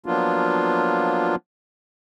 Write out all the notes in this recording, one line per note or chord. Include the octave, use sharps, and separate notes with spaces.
F3 F#3 A#3 B3 D4 F4